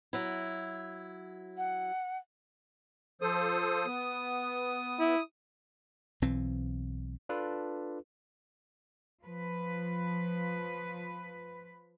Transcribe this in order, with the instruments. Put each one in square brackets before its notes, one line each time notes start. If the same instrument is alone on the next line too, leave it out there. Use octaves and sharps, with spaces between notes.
[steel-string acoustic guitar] F#3 E4
[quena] F#5
[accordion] F3 A4 C5 [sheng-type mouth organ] D#6
[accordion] B3
[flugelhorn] E4
[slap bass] B1 E3 C4
[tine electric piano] D4 F4 A4 B4
[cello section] F3 B4